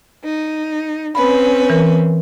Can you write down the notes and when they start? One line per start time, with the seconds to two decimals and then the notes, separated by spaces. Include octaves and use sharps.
0.24 D#4
1.15 C4 C#4 B4 B5
1.70 E3 A#4